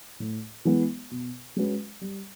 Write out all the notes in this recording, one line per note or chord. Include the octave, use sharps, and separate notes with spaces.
A2
E3 G#3 B3
B2
G#3 C#4 F#4 B4
G3